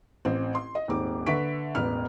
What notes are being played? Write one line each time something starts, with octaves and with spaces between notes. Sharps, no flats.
A1 C4
C6
D#5
D#1 G#2 C4 D6
D3 B4 E5 C#6 B6 D7
E1 A1 B4 F6